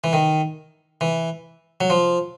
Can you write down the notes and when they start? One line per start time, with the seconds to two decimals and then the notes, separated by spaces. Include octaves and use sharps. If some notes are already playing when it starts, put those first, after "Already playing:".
0.04 E3
0.13 D#3
1.01 E3
1.81 F#3
1.90 F3